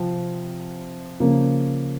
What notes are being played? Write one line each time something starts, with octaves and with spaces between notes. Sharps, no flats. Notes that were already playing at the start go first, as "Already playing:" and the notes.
Already playing: C3 F3 C4
C#3 F3 A#3